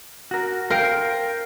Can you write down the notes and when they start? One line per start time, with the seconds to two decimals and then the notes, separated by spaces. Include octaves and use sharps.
0.31 F#4 A#4
0.70 A#4 C5 F5 G5